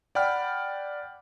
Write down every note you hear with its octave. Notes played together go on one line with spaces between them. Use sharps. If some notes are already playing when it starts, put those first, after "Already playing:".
D5 F#5 G5 B5 F6